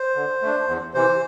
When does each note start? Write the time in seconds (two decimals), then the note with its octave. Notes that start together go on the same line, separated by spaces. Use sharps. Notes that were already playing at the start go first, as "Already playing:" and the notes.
Already playing: C5
0.15 D3
0.42 A3 D4
0.68 E2
0.94 C3 E3 C5